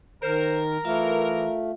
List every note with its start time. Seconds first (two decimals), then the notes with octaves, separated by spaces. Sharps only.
0.23 D#3 A#4 C5
0.85 E3 A3 F4 E5 F5